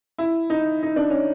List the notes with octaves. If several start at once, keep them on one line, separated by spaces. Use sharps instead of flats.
E4
D#4
D#4
D4
C#4